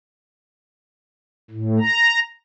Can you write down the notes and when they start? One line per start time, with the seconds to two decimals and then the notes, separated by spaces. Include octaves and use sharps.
1.51 A2
1.79 A#5